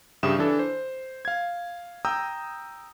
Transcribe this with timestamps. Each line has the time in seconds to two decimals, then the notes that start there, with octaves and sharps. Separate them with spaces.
0.23 G2 C#3 G4 E5 D#6 E7
0.38 E3 D4 A4
0.59 C5
1.25 F5 G#6
2.05 G5 A#5 D#6 E6 G6